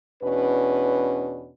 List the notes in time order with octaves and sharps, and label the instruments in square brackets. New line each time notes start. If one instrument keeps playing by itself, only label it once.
[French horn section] E2 B2 C#4 D4 B4